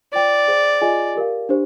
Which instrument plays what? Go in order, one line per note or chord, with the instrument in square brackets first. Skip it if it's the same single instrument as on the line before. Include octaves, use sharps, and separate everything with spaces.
[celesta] F4 C5 G5 [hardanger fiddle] D5
[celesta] G#4 C5 G5
F4 G#4 D#5 G#5
G4 A#4 F5
D4 G4 C5